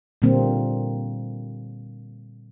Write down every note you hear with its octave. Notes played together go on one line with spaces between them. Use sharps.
A#2 D3 G3 A#3 C4